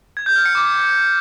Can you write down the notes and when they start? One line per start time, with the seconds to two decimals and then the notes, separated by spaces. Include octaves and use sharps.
0.17 G#6
0.26 G6
0.36 F6
0.45 C#7
0.55 D6